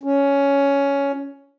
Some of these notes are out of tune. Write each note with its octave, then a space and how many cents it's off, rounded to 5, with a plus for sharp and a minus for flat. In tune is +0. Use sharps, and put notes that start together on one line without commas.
C#4 +10